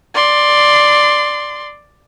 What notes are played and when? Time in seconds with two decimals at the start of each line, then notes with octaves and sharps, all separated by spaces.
0.14 D5 C6